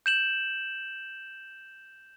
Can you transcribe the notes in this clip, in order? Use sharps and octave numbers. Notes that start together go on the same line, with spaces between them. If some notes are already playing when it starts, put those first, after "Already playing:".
G6 E7 F#7